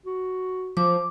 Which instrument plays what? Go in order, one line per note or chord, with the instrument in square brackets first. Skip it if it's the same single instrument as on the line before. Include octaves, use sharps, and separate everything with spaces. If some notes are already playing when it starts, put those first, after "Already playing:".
[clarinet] F#4
[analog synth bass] F3 [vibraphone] D6